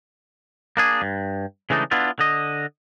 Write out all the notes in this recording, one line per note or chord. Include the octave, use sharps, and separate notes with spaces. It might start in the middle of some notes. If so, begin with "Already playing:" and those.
A#3 D4 G#4
G2
C#3 E3 G#3 A3 D4 D#4
B3 D4 E4 F4
D3 D#5